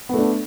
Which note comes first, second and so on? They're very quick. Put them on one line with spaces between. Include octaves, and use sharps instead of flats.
B3 A3 D4